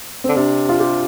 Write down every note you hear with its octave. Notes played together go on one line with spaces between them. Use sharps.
D3 C4
C3 D4
F4
G4